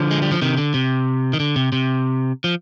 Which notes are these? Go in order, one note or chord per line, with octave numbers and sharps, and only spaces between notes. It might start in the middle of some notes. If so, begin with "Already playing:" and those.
Already playing: D3 F3
G#3
G3
F3
C3 D#3
D3
C3
D#3
D3
C3
C3
F3